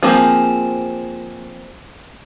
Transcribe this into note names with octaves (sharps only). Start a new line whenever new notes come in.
F3 A#3 C4 G#4